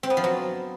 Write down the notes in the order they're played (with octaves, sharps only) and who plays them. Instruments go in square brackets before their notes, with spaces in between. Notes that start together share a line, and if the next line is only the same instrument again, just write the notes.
[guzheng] C4
B3
F3
F#3